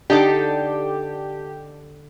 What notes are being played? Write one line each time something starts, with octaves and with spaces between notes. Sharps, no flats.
D3 D4 D#4 G4 A4